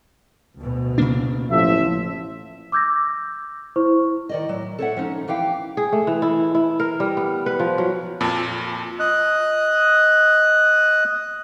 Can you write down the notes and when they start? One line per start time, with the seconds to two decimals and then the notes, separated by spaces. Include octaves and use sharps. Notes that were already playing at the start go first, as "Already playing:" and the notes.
0.59 D2 B2
0.98 C#3 A#3 D4
1.50 A1 F3 E5
2.72 D6 E6 G6 G#6 A#6
3.76 E4 C5 C#6
4.29 D#3 D5 D#5
4.49 A2 F#3
4.79 A4 A#4 C#5 D#5 E5 F#5
4.97 F3 C#4 D#4
5.28 E3 G4 F5 G5
5.77 G#4
5.92 A3
6.07 E3
6.22 E4
6.55 E4
6.80 A#4
7.00 G3
7.17 B3
7.46 B4
7.60 F3
7.78 F#3
8.21 F2 A#2 F4 A5
9.00 D#5 F#6